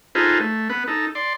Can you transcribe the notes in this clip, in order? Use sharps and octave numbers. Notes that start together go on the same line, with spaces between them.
D#4 F4 G#4 A4 B4 C5
A3
B3 B4
D#4 A4
D5 C6